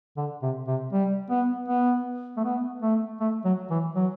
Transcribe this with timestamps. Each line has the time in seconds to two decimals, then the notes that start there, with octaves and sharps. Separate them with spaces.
0.17 D3
0.42 C3
0.67 C3
0.93 G3
1.30 B3
1.68 B3
2.37 A3
2.44 B3
2.83 A3
3.21 A3
3.45 F#3
3.71 E3
3.95 F#3